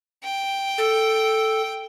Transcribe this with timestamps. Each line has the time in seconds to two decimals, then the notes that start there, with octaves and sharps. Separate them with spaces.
0.24 G5
0.78 A4